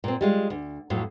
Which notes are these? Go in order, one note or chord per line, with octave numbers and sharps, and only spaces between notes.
A#2 C4
G3 G#3 F4
D2
F2 A2 F#3